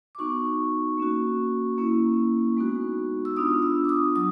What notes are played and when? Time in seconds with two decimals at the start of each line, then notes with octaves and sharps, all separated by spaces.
0.15 D6
0.18 B3 D#4 F#4 C#6
0.98 A#3 C#4 F#4
1.78 A#3 C#4 E4
2.57 G#3 B3 D#4 F#4
3.25 E6
3.37 B3 D4 F4 D#6
3.62 E6
3.85 D6
3.89 D#6
4.16 F#3 D#6